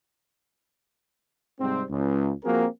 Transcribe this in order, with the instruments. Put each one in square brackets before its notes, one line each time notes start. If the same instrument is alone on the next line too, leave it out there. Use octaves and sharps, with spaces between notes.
[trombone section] G#2 C3 G3 C4
C#2
F3 A#3 C4 F#4 G#4 A#4